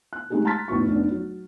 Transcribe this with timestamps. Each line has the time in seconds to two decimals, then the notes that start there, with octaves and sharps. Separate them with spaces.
0.13 F#6
0.30 G#3 A3 C4 D#4 G4 G#4
0.45 A5 A#5 C6 F6 A6 B6
0.68 F1 A2 B3 F#4 C#6
0.88 F1 B3 D4
1.11 F#3